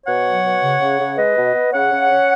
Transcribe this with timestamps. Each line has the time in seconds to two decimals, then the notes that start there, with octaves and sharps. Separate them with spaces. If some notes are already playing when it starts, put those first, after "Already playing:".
0.06 B2 C#5 F#5
0.25 F#3
0.44 B2
0.63 C#3
0.81 C#3
0.99 C#3
1.17 G#3 B4 D#5
1.36 B2
1.54 B3
1.73 C#3 C#5 F#5
1.92 C#3
2.10 C#4